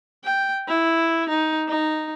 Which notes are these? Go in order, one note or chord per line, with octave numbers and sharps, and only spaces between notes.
G5
E4
D#4
D#4